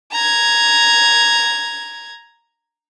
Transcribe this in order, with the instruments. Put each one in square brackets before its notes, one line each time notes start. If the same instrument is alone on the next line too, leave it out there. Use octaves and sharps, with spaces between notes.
[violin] A#5 G#6